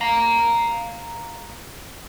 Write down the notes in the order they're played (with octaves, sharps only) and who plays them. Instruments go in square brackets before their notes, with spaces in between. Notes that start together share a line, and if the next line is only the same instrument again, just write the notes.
[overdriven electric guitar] F5 A#5